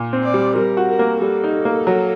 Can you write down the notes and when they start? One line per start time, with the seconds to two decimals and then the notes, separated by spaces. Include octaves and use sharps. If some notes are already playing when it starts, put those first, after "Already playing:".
Already playing: A#2
0.13 C4
0.23 D5
0.34 G3
0.56 G3 A#4
0.77 F#4
0.88 A#4
0.99 A#3
1.21 G3 A4
1.44 D#4
1.65 A#3
1.87 F#3